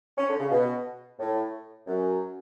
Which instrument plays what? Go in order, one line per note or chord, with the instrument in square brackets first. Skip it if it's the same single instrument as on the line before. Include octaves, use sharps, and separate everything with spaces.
[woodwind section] C#4
D3
C#3
B2
A2
F#2